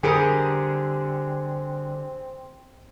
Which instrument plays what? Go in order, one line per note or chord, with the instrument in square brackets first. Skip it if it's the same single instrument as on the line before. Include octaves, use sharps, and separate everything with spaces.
[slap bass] D3 [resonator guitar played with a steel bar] G3 G4 A#4 [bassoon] C4 [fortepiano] G#4 D#6